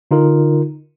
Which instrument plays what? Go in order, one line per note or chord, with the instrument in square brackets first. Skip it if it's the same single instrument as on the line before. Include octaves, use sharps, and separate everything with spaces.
[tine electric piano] D3 D#4 F4 A#4